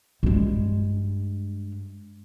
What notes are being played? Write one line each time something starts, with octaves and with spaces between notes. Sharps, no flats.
G2 G#3